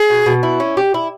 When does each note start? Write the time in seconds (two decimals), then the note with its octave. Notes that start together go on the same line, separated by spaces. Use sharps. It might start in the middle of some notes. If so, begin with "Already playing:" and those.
Already playing: G#4
0.10 B2
0.26 B2
0.43 E4
0.60 C#4
0.77 G4
0.94 E4